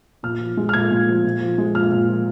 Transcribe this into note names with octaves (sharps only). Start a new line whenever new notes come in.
A#2 F6
F3
G#3
F6
A#2 G#6
A#2
F3
A#2
F3
G#3
A#2 F6
A#2
F3